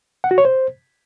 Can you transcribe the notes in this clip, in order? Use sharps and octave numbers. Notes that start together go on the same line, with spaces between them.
F#5
F#4
C#5
C5